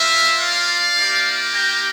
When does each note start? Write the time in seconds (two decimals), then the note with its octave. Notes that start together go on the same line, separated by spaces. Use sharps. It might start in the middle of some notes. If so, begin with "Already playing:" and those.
Already playing: A#3 F4 C5 E5
0.39 D5 F5
0.97 A#3 E4 G4
1.54 G5 A#5